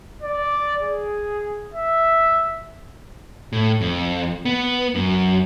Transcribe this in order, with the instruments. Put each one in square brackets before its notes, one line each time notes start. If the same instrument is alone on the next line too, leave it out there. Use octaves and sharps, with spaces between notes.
[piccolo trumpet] D5
G#4
E5
[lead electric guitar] A2
F2
B3
F#2